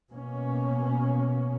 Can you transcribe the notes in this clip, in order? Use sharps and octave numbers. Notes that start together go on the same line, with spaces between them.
B2 A#3 C#4